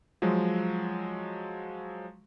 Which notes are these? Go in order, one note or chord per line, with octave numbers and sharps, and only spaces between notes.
F3 F#3 G#3